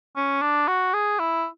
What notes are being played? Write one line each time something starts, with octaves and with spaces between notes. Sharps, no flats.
C#4
D4
F#4
G#4
E4